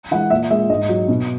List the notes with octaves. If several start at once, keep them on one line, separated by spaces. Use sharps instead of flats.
E3 G#3 F#5
A#2 E5
G#3 E5
G#2 D#5
F#3
B2